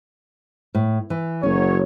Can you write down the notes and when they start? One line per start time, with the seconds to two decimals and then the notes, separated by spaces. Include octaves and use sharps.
0.75 A2
1.10 E3
1.43 F#1 F#3 C#4 C#5